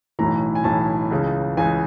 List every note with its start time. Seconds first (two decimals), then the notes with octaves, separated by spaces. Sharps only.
0.19 B1 A2 E3 A#5
0.55 G#5
0.64 B1 A2 E3 A5
1.11 C#2 C#3 E3
1.57 C#2 C#3 E3 G#5